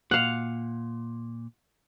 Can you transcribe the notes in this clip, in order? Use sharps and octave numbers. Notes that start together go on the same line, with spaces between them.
A#2 F5 F#5